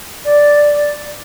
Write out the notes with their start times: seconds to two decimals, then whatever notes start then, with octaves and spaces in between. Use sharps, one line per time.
0.25 D5